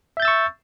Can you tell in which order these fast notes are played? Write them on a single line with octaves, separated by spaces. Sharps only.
E5 G6 A6 E6 C#6